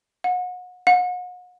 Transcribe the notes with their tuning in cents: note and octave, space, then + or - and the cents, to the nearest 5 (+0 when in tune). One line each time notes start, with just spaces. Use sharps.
F#5 -35
F#5 -40